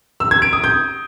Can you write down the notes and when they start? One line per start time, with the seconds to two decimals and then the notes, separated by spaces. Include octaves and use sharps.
0.20 E6
0.31 G#6
0.42 D7
0.53 D#6
0.64 G6